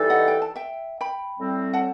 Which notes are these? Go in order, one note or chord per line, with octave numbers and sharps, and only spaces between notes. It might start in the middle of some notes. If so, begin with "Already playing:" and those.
Already playing: E3 G3 D#4 A4
D#5 F#5
G5
A5
E5 G5
G5 B5
A2 G3 C4
F#5 A5